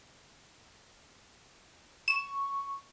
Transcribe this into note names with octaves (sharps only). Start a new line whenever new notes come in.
C#6 E7